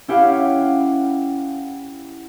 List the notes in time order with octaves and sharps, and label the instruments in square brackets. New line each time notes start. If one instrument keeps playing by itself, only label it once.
[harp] C#4 E4 G4 F5 F#5